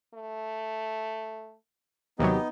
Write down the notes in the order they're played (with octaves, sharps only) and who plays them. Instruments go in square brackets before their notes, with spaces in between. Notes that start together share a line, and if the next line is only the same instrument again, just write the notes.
[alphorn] A3
[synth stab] D#2 C3 F#3 [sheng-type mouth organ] B3 D#4 D#5 [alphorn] G4